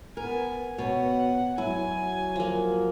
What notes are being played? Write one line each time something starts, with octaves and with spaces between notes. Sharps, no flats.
B3 A#4 G#5
B2 C#5 F#5
F#3 E4 G#5
F3 A#3